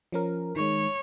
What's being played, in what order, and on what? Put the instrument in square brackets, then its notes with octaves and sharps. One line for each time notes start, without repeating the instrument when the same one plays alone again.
[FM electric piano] F3 C#4 A#4
[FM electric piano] D#3 G#3 [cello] C#5